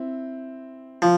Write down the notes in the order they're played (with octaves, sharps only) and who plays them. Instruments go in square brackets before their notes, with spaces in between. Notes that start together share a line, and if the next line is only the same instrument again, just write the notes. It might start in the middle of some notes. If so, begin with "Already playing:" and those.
Already playing: [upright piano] C4 E4
[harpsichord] F3